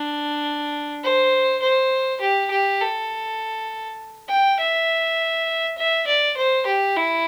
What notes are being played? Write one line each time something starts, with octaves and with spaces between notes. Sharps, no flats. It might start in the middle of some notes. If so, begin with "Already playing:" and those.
Already playing: D4
C5
C5
G4
G4
A4
G5
E5
E5
D5
C5
G4
E4